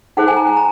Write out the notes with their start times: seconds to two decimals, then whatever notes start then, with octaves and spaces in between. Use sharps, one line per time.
0.17 D#4 G#4 C5 F#5
0.28 G#5
0.37 A#5
0.47 G#5
0.57 A#5